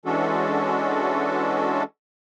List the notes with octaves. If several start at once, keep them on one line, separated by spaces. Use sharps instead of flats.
E3 G#3 C#4 D4 F#4 A4